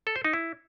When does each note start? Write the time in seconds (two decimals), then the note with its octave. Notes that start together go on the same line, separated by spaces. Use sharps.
0.07 A4
0.16 C5
0.25 D#4
0.33 E4